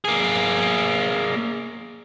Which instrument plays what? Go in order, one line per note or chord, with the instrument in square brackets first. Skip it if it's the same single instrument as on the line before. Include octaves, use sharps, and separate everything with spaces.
[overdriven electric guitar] A#3 G#4